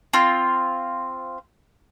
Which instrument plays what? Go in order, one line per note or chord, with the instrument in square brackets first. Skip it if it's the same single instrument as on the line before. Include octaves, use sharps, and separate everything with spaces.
[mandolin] C4 F4